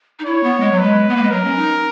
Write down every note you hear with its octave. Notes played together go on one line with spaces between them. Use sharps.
D#4
E4 C#5
B3
G#3
F#3
G#3 B4
B3
A#3
G#3
F#3 A#4
C#4
D#4